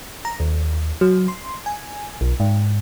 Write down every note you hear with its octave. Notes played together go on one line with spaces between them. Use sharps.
A#5
D#2
F#3
C6
G#5
B1
G#2